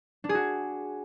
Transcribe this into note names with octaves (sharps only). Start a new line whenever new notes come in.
D4
G#4
F#4